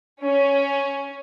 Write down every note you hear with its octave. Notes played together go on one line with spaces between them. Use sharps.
C#4